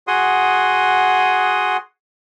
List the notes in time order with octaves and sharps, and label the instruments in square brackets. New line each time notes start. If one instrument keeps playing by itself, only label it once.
[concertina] F#4 G#4 F#5 C6 D#6